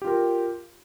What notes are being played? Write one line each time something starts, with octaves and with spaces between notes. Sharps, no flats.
F4 G4 A#4